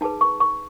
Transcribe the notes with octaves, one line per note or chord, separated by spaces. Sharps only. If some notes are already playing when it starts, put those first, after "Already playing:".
D#4 G#4 B4 A5
C#6
C#6